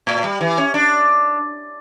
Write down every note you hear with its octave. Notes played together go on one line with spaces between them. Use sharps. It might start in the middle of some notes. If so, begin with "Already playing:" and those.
A2
G3
E3
C#4
D4